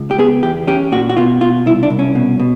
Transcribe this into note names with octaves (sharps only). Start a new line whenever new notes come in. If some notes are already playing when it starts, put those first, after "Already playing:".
Already playing: C#2
G4
B3 G#4
E2 G4
C#4 G4
A#2 F#4
F#4
B2 F4
B2 F4
C2 E4
D4
C2
C#4
B2
B2